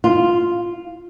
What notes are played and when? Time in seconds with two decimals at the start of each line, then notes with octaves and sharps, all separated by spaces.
0.04 F4